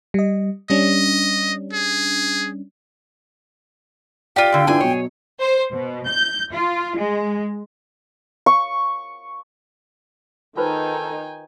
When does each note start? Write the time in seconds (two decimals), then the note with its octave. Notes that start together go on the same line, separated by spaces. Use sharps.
0.14 G3 D#5
0.70 G3 C#4 D4 D#5
1.73 G#4
4.36 F4 G4 D5 G5
4.52 A2 D3
4.67 E3 D4 F4 G#4 G#5
4.80 B2 F#3 C#5
5.41 C5
5.72 B2
6.08 G6
6.51 F4
6.96 G#3
8.46 C#6
10.57 D#3 D#4 F4 A4 B4 C5 G5 G#5